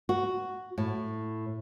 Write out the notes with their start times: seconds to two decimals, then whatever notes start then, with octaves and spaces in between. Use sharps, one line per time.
0.09 F#4
0.78 A2